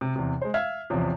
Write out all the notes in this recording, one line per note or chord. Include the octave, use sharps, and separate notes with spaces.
C3
E2 C3
G#3 C5
E5 F5 F6 G#6
A1 E2 C3 F3